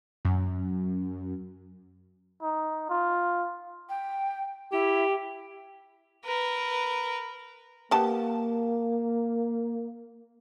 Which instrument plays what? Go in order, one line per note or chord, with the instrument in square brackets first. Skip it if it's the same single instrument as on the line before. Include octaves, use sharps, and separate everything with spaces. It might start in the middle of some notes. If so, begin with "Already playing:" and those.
[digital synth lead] F#2
[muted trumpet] D#4
F4
[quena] G5
[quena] E4 [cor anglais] G4
[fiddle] A#4 B4
[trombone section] A#3 [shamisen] B3 G4 A5